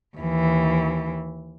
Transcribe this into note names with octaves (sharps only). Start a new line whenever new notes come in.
D#2 E3